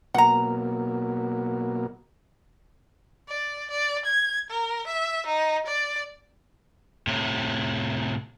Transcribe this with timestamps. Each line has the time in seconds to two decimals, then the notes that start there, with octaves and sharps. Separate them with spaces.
0.14 B2 F#3 A#3 F#5 A#5
3.29 D5
3.70 D5
4.05 G#6
4.50 A#4
4.87 E5
5.26 D#4
5.66 D5
7.07 A2 C3